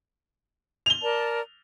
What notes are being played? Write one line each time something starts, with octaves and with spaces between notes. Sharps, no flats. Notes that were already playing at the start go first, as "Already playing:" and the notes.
F7 G7
A#4 D5 A5